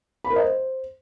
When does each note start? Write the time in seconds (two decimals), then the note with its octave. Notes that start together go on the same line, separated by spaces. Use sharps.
0.24 B5
0.30 A#4
0.36 D#5
0.42 C5